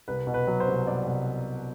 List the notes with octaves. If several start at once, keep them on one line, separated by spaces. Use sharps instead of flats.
C2 B4
B2
B4
F#3
C5
C2
C2 D5
C2